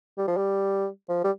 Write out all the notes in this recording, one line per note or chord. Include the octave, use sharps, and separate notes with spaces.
G3
F3
G3
F3
G3